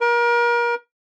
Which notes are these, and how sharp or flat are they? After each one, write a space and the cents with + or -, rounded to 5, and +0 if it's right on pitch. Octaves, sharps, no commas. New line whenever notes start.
A#4 +35